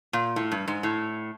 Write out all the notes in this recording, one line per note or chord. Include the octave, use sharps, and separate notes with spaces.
A#2
A2
G2
G#2
A2